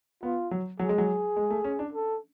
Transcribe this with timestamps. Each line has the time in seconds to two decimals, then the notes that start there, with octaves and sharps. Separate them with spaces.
0.23 B3 F4
0.51 F#3
0.79 F#3 G#4
0.89 G#3
0.98 F#3
1.37 G#3
1.50 A3
1.64 C#4
1.79 D4
1.93 A4